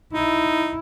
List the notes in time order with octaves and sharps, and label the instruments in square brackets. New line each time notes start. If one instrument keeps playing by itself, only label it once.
[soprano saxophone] D#4 [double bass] E4